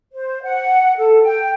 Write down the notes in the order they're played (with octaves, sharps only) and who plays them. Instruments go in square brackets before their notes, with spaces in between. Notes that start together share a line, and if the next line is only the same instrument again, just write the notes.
[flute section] C5
F#5
A4
G5